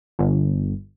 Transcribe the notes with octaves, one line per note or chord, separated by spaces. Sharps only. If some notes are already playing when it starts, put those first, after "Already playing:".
G1